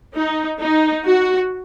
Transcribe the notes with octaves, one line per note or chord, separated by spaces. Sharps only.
D#4
D#4
F#4